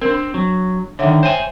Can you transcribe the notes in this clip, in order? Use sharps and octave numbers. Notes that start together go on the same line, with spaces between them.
C4 D4 A#4
F#3
D3 D#3 C#5 E5 F#5
C5 C#5 E5 G5 G#5